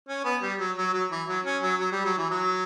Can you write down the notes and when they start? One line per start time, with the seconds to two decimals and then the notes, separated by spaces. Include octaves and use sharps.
0.08 C#4
0.24 B3
0.42 G3
0.59 F#3
0.77 F#3
0.93 F#3
1.11 E3
1.28 F#3
1.45 C#4
1.63 F#3
1.80 F#3
1.92 G3
2.05 F#3
2.17 E3
2.30 F#3